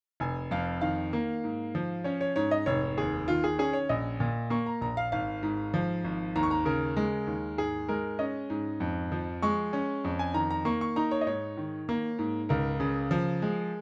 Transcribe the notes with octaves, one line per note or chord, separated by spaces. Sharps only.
F1 G#5
F2 F5
D#3 F5
A#3
G#2
F3
C#4 C#5
C#5
G#2 C#5
D#5
F1 C#5
D#2 G#4
D#3 F4
G#4
C#4 G#4
C#5
A#1 D#5
A#2
A#3 C#6
A#5
A#1 A#5
F5
G#1 F5
G#2
F3
G#1
D#2 A#5
C#6
A#5
C#3 A#4
G#3
D#2
G#2 G#4
G#3 A#4
C#4 D#5
G#2
F2
F3
G#3 C#6
C#4
F2
G#5
D#3 A#5
A#5
A#3 C#6
C#6
D#4 A#5
C#5
D#5
G#2 C#5
D#3
A#3
G#2
C#2 A#4
C#3
F3
G#3